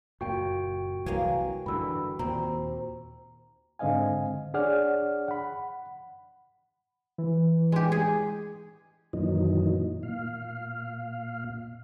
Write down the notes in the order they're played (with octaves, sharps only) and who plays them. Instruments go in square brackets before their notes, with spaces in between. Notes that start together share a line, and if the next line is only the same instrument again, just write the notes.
[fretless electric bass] F#1 A#2 [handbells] F#4 G5
[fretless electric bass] C2 E3 F#3 [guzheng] A#3 G#4 G#5
[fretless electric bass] G2 D3 E3 [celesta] B5 E6
[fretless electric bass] D#2 A#2 [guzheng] C4 [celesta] A#5
[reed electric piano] G#2 D3 C4 D#5 F5 G#5
D4 G#4 C#5 D5 F#5 F6
F#5 B5
[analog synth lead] E3
[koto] G#3 G4
G#4
[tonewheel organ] F#2 A#2 D#3 E3 F#3 D#4
A#2 F5